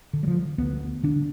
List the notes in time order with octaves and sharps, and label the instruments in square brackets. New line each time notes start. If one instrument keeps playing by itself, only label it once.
[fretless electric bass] D3
G3
F3
D2 B3
D3 D4